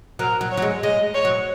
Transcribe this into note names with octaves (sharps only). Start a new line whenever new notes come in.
F#3 A#4
F#3
C#5
F#3
G#3
G#3 D#5
C#5
F#3